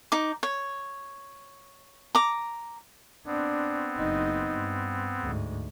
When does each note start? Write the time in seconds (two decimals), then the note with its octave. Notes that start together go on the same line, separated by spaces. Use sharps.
0.12 D#4 D6
0.43 C#5
2.15 A#5 D6
3.26 B3 C4 D4
3.97 F#1 D#4
4.53 G2
5.22 D2 G#2